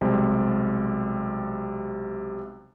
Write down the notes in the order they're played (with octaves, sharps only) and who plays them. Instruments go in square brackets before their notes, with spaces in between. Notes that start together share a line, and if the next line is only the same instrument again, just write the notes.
[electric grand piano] B1 C3 G3 G#3